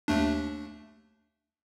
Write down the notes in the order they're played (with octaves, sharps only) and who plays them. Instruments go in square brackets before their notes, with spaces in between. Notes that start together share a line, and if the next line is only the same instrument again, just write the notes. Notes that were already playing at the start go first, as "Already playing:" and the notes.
[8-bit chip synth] D#2 A3 D4